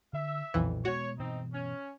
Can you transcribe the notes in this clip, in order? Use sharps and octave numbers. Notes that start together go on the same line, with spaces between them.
D3 E5
B1 F2 A#2 E3
B2 G#3 B3 F#4 C#5
G2 B2 E3 C4 D#4
C#4